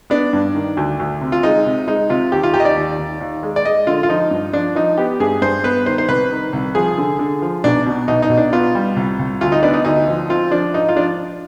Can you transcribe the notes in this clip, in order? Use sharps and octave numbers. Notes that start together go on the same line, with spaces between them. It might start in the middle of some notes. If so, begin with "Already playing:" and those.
B3 D4
G2
D#3
D2
D2
C3
F4
G#3 D#4
C3
G#3 D#4
C3 F4
D#2 G4
F4
D#2 G4
D#5
D5
D#2
D#2
D#2
G#3
D5
G#3 D#5
D3 F4
F4
F3 D#4
G2
F3 D4
F3 D#4
B3 G4
G2 G#4
G2 C5
B3 B4
D#3 C5
C5
C2 B4
D#3
C2
F3 G#4
D3
D3
F3
B1 D4
B2
B1 D#4
D#4
B1
D4
B3 F4
G3
C2
C2
D2 F4
D#4
B3 D4
D#4
D2 D#4
F3
C4 F4
F3 D4
G#2 D#4
F4
F3 D4